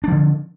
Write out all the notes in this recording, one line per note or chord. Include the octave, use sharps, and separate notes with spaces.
D3 F3 D4